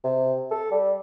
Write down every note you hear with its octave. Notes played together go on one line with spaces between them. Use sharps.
C3
A4
G3